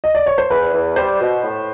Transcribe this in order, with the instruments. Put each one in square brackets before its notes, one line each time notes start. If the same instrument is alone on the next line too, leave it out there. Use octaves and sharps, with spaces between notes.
[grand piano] D#5
D5
C#5
C5
[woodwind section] E2 [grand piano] B4
[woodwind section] E2
[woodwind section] G3 [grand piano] C5
[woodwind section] B2
A2